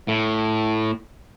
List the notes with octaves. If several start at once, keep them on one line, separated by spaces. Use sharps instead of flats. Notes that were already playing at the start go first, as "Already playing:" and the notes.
A2